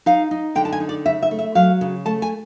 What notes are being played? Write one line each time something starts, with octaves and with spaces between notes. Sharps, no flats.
D#4 F5
D#4
D3 G5
A5
G#5
D#4
D5
C#3 E5
E5
A3
E5
F#3 F5
C#3
A3 A5
G#5